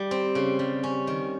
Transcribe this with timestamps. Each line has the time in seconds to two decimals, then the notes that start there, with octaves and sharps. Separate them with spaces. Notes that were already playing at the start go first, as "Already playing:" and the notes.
Already playing: G3 D#4
0.11 C4
0.35 C#3
0.59 G3
0.83 C#4
1.07 D#3